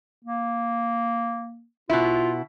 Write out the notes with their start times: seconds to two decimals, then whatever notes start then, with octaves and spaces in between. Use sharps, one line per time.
0.24 A#3
1.90 B2 E4 F4